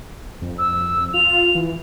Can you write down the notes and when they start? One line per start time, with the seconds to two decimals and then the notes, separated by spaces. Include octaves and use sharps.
0.42 F2
0.58 E6
1.14 F4 F7
1.55 E3